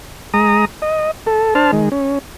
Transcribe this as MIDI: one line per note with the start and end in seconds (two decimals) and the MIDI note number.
0.34 0.65 56
0.34 0.65 82
0.34 0.65 87
0.82 1.11 75
1.27 1.54 69
1.55 1.71 62
1.55 1.71 72
1.55 1.71 81
1.55 1.71 89
1.72 1.89 51
1.72 1.89 56
1.92 2.19 61